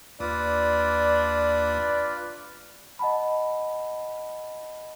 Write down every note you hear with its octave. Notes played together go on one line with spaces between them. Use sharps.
D#2 D4 F4 B4 D5
D#5 F#5 A5 B5